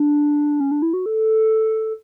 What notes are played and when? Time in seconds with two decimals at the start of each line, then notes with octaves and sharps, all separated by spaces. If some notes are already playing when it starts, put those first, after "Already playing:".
Already playing: D4
0.60 C#4
0.71 D4
0.82 E4
0.93 F#4
1.06 A4